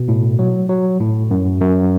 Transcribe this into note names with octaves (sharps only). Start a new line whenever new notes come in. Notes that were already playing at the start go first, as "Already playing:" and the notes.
Already playing: B2
A2
F#3
F#3
A2
F#2
F#2